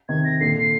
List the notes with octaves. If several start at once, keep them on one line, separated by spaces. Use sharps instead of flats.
C3 D#3 G#6
A#6
A#2 D3 C7